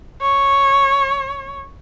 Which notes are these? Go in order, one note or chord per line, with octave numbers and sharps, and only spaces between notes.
C#5